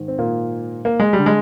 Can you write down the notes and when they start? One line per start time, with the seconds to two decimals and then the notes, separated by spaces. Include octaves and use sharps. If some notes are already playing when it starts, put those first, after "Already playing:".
Already playing: G#2 D#3
0.08 C4
0.19 A#2 A#3
0.85 A#3
1.00 G#3
1.13 G3
1.19 D3
1.26 G#3